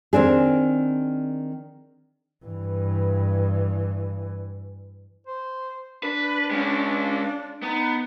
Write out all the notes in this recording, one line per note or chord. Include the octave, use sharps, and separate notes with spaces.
D#3 C4 D4 G#4
G2 E3
C5
D4 B4
G#3 C#4
B3 D#4